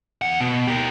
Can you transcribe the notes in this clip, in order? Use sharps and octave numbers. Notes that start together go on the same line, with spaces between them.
E2 F#5
B2
G4 A#4